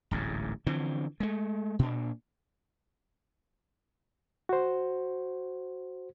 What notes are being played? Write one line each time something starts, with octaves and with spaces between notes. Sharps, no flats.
D1 A1 G#2
D3 E3 F3 C4
G#3 A3
A#2 D4
F#4 C5